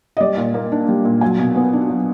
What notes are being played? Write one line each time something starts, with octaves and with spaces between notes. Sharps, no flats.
D#5
G3 D5
A#2
A#3
D4
G3
A#2
F#3 G#5
B2
B3
D4
F#3